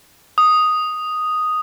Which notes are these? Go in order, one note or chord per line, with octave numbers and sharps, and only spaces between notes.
D#6